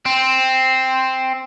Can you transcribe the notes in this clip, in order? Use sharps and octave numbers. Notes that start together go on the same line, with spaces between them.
C4